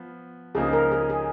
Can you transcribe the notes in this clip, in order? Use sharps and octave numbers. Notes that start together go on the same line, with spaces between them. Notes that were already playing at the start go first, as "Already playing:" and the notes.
Already playing: F3 B3
C#2 C#3 F3 A#3 D#4 G#4
A#4
G#4
G#4